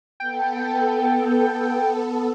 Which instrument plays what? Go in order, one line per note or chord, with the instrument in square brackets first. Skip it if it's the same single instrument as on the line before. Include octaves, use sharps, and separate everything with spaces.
[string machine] B3 A4 [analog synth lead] G5